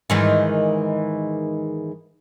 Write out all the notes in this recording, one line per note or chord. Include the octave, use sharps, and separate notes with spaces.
G#2 D#3 E3